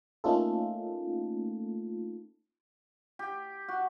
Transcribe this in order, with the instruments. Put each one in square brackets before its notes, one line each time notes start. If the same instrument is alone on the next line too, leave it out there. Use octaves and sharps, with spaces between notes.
[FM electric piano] A3 A#3 C#4 D#4 F4 A4
[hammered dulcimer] G4
F#4